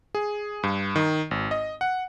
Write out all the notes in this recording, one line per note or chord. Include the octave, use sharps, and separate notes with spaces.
G#4
G2
D#3
G#1
D#5
F#5